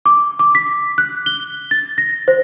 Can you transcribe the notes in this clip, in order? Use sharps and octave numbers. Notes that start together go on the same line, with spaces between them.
D6
D6
B6
F#6
G7
A6
A#6
C5